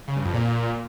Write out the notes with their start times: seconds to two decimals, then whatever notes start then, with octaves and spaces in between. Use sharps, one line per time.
0.08 C#3
0.16 G2
0.25 F2
0.34 A#2